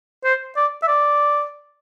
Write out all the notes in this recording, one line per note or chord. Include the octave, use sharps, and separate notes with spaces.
C5
D5
E5
D5